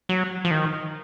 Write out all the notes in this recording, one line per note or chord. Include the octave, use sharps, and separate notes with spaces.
F#3
F3
D#3